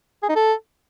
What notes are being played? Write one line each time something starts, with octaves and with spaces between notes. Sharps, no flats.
G#4
D#4
A4